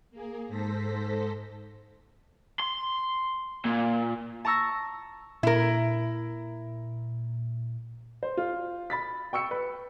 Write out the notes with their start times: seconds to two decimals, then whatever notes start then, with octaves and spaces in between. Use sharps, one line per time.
0.11 A#3 G#4
0.48 G#2 A4 C5 A#6 B6
2.60 C6
3.65 A#2
4.45 A5 A#5 C#6 E6 A#6
5.43 A#2 E4 A#4
8.23 C5
8.37 F4
8.90 B5 A6 B6
9.33 G5 C#6 E6 C#7
9.51 B4